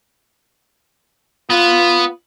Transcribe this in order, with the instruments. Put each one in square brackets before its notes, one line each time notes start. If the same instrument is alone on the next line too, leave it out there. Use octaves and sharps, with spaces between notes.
[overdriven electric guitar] B3 [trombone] F4